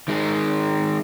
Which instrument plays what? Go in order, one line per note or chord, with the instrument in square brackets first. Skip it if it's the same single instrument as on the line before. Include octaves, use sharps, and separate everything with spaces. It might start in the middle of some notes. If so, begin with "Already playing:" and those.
[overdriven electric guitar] D#3 G#3